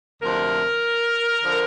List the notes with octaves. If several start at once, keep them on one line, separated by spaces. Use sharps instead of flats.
D2 C3 F3 A#4
D3 F3